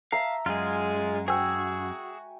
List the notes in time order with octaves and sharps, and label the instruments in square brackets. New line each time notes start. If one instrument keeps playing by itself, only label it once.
[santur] E5 A#5 [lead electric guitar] F5
[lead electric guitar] F#2 [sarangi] G#3 [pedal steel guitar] F4 G#4
[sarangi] F#4 [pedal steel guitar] G#4 E6 [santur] G5 G#5